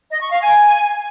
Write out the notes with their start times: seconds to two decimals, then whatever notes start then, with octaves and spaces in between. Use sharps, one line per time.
0.11 D#5
0.21 C#6
0.31 F5
0.41 G#5